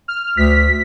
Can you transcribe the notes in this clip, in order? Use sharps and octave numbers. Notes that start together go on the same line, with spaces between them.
F6
D2 B6